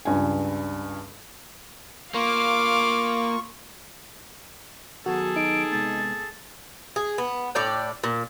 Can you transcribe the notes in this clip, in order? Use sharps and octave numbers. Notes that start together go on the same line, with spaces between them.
C#2 G2 G#5
A#3 F4 F5 C#6 D6
D#3 F#3 B3 F#4 G#4 A4
D#4 D7
C3 G#3 B3 A6
G#4
B3
A2 D4 D5 G5
A#2